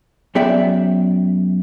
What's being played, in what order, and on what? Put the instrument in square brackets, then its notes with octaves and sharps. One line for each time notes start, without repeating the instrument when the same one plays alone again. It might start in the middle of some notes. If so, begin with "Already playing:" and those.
[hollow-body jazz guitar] F#2 B3 G#4 D5 E5 G5